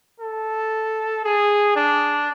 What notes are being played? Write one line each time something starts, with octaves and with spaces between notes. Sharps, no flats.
A4
G#4
D4